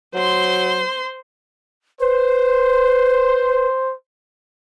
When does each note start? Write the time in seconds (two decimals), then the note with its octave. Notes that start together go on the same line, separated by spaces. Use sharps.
0.14 F#3 C5 C6
2.00 B4 C5